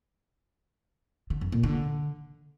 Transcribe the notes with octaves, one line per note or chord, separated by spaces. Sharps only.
D3
F#2
A#2
D3